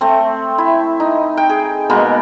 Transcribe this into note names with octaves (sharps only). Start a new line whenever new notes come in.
A3 C4
E4
D#4
G5
G#4
B2 G#3 A#3 B3